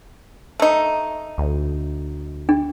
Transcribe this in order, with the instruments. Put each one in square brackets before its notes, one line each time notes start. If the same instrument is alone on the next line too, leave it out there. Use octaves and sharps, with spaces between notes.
[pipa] A3 D#4
[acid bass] D2
[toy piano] D4